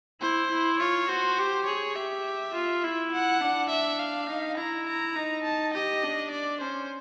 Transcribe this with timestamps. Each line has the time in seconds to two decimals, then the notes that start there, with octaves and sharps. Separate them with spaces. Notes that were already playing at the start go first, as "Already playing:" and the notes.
0.21 E4 C5
0.50 E4
0.79 F4 C#5
1.08 F#4 C5
1.38 G4
1.66 G#4 C#5
1.96 G4 E5
2.54 F4
2.84 E4
3.12 F#5
3.41 D4
3.70 E5
3.99 F5
4.29 D#4
4.57 E4 A#5
4.87 A#5
5.15 D#4
5.44 A5
5.74 G4 D#5
6.03 D4
6.31 D5
6.61 C#4 C5